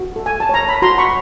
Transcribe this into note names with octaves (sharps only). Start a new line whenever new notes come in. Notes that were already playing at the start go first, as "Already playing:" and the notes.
Already playing: F#4
A4
G#5
A5
C#5 A#5
B5
F#4 A#5 C6
B5 C#6